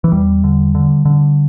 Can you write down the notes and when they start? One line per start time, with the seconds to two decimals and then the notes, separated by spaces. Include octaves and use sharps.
0.04 E3
0.12 E2 G3
0.44 D3
0.75 D3
1.05 D3